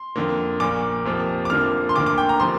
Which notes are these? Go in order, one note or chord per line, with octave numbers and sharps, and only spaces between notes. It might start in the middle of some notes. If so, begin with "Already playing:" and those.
Already playing: C6
F2 D3 A#3
A#1 A#2 A#3 D6
F2 C3 F3 A#3
D6
F1 F2 D3 F3 A#3 F6
C6
D2 D3 A#3 D6
D6
G5
A#5
C3 F3 A#3 C6